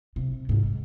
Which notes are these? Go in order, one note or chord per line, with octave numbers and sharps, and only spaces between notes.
C3
G#2